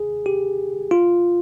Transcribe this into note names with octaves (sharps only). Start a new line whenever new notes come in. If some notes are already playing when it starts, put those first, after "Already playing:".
Already playing: G#4
G4
F4